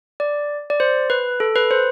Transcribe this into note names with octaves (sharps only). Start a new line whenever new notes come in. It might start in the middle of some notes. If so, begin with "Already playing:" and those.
D5
D5
C5
B4
A4
B4
C5